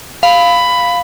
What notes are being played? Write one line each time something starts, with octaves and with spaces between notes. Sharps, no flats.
F5 B5